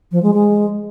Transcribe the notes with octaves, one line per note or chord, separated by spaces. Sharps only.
F3
G#3
G#3